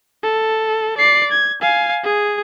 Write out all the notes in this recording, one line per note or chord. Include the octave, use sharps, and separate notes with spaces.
A4
D5 C7
G#6
F5 G#5
G#4